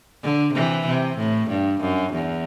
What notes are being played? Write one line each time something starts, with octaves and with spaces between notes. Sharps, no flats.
D3
C3 E3
C3
A2
G2
F#2
E2